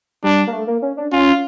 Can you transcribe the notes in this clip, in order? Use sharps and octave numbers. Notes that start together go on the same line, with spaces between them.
G3 D4
A#3
A3
A#3
C#4
D4
C#4 F4